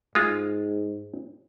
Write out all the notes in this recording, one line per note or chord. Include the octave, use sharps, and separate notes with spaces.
G#2 G#3 F4